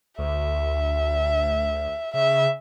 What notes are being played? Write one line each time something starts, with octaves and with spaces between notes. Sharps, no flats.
D2 E5
C#3 E5